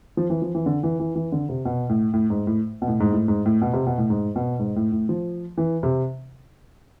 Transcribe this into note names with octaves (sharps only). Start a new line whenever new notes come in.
F3
E3
F3
E3
D3
E3
E3
E3
D3
C3
B2
A2
A2
G#2
A2
B2
A2
G#2
A2
G#2
A2
B2
C3
B2
A2
G#2
B2
G#2
A2
A2
F3
E3
C3